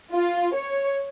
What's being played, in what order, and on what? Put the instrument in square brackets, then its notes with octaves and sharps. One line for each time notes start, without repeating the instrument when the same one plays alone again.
[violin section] F4
C#5